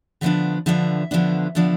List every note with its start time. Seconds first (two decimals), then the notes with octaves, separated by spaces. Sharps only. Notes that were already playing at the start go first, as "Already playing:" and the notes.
0.21 D3 F3 B3 D4 E5
0.66 D3 F3 B3 D4 E5
1.11 D3 F3 B3 D4
1.55 D3 F3 B3 D4